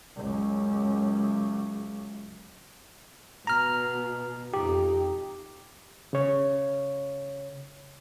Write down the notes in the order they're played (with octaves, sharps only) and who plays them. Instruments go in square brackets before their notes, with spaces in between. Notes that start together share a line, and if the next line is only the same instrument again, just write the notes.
[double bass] C#2 F#2
[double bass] B2 [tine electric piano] A#5 F6
[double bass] F2 D#4 [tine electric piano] G4
[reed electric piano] C#3 C#5